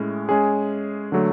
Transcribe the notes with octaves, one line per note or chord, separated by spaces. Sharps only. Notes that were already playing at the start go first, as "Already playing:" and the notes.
Already playing: A2 G#3 C#4 E4
G#3 C#4 G#4
D3 F#3 A3